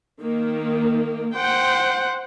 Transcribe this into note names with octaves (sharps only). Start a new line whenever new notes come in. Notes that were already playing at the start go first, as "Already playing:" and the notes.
D#3 A#3
C5 F#5 G5